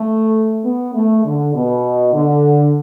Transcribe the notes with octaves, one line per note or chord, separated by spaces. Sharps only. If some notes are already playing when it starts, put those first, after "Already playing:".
Already playing: A3
B3
A3
D3
B2
D3